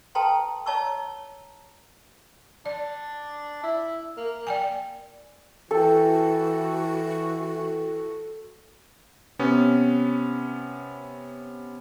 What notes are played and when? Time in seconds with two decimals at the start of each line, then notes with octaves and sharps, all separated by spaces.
0.15 A4 B4 G5 A5 A#5 C6
0.66 C#5 D#5 A5 A#5 C#6 E6
2.66 D4 D5
3.63 E4
4.17 A#3
4.47 D5 G5 G#5
5.71 E3 F#4 A4 G5
9.39 C3 B3 C#4